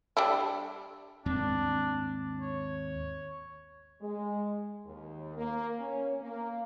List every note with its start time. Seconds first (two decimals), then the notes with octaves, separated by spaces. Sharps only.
0.17 G3 D4 E4
1.26 D#2 G#2 C4 D4
2.41 C#5
4.00 G#3
4.85 D#2
5.36 A#3
5.77 C#4
6.20 A#3